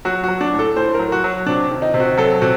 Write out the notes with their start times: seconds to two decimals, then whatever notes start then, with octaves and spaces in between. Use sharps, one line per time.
0.05 F#3 F#4
0.24 F#3 F#4
0.41 D4
0.53 A2
0.59 A4
0.76 A2 C5
0.94 F#3 A#4
1.12 F#4
1.24 F#3
1.46 C3 D4
1.71 D#3
1.82 D#4
1.94 C3
2.00 F#4
2.18 F#3 A4
2.42 C3 F#4